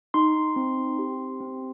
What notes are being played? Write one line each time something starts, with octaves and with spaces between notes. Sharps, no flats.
D#4 C6
C4
G4
C4